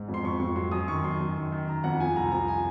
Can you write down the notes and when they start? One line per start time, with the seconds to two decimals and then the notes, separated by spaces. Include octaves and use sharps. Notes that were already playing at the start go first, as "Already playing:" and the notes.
Already playing: G#2
0.08 F2
0.14 C6
0.24 F2 C#6
0.40 F2 C#6
0.56 F#3 C6
0.72 F#2 D#6
0.88 D#3 C#6
1.04 F#2 C6
1.20 F#2
1.36 D#3
1.52 D#3
1.68 D#3 A#5
1.84 F2 F#5
2.00 F3 G#5
2.16 C2 A#5
2.32 F3 A#5
2.48 G#5